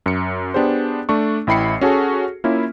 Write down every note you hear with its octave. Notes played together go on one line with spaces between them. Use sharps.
F#2 C#7
B3 D4 G4 G#4 C5
A3 D4 C#6
A1 E4 G5 B5 C7 C#7
C#4 F#4 G#4 A4
A#3 C#4 E4 F4